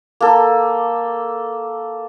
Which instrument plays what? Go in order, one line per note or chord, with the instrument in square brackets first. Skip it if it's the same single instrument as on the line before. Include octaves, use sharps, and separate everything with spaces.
[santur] A#3 A4